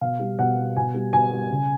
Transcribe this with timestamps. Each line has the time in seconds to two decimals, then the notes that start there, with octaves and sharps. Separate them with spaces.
0.01 B2 F5
0.20 G3
0.39 B2 F#5
0.58 G3
0.76 B2 G#5
0.94 G3
1.13 B2 G#5
1.32 G3
1.51 C#3